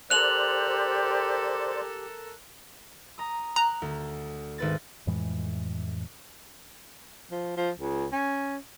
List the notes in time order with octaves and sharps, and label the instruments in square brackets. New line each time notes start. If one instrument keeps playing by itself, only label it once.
[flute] G4 [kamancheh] A4 A#4 [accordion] C5 D5 [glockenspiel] F#6 F7 F#7
[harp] A#5 D#6
[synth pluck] A#5 [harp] F#6
[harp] D2
G#1 B4 A6
[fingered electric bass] F2 A2 E3 G#3
[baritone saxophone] F3
F3
C#2
C#4